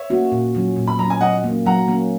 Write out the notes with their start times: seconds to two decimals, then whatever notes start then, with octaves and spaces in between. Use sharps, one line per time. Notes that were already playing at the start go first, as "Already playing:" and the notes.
Already playing: C#5 E5
0.10 A#3 C#4 F#4
0.32 A#2
0.55 F#3 C#4
0.76 A#2
0.87 B5
0.99 F#3 C#4 A#5
1.10 G#5
1.21 F#3 D#5 F#5
1.44 A#3 C#4
1.66 F#3 F#5 A#5
1.88 A#3 C#4